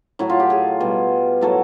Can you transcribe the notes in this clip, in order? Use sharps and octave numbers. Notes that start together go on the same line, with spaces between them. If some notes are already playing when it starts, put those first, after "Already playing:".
A2 F#3 A3 E4
F4
G4
G#4
B2 G3
A2 F#3 A3 A4